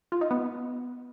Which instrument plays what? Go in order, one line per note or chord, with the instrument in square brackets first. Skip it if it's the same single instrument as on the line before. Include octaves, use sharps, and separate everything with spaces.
[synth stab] F4
D#4
B3